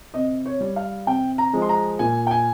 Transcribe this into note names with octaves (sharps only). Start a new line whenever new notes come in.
C3 D#5
C#5
G3
F5
C3 G5
A#5
F3 G#3
C6
A#5
A#2 G#5
G5
G#5